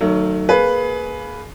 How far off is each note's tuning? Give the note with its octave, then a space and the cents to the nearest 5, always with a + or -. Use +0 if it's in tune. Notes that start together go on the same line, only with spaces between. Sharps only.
D#3 -15 F#3 +15 A3 +30
A#3 +0 G#4 +25 B4 +0